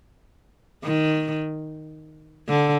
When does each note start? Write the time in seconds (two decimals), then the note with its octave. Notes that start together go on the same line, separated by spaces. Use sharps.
0.84 D#3
2.48 D3